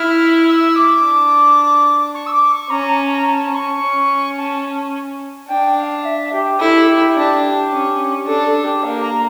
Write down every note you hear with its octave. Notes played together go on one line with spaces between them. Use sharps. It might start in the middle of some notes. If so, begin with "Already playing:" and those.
Already playing: E4 F6
E6
D6
D4
C#6
E6
D6
C#6
C#4 A#5
A5
A#5
A5
C#6
C#4
A5
D4 G5
F5
E5
G4
E4 A4
G4
D4
C#4
D4 A4
A4
G4
A#3 F5
A#5